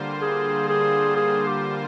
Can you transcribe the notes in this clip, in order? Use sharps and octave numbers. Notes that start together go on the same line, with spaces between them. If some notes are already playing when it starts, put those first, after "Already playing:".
Already playing: D3 G3 A#3 F4 C5
G#4
G#4
G#4
G4